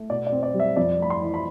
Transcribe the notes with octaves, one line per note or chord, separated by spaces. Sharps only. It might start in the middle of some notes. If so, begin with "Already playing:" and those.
Already playing: A3
B2 D5
D5
C4
D5
G3
E5
F2 D5
A3 B5
C6
E3
B5